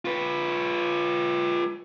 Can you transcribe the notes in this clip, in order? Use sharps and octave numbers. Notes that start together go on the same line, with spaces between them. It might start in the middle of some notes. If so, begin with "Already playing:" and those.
F4 B4